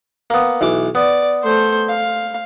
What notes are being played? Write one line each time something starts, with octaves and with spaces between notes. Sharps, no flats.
A#3 B3
B1 E3 D6
B3 D5
A3 C5
F5